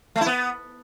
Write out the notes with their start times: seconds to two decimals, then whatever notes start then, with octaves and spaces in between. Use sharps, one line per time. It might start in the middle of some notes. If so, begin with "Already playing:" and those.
0.16 A3
0.21 E4
0.26 B3